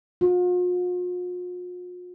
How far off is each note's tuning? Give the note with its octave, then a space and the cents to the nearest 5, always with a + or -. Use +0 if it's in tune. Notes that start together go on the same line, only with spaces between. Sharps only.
F4 +45